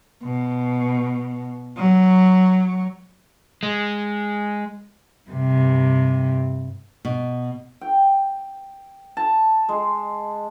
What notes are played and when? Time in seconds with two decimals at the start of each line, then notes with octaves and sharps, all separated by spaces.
0.24 B2
1.78 F#3
3.63 G#3
5.30 G2 C3
7.05 B2
7.81 G5
9.17 A5
9.69 G#3